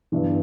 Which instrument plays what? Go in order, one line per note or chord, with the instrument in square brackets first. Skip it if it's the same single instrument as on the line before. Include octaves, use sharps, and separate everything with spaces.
[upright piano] G1 G2 E3